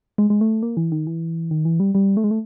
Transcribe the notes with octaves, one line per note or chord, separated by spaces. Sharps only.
G#3
G#3
A3
A#3
E3
D#3
E3
D#3
E3
G3
G3
A3
G#3
A3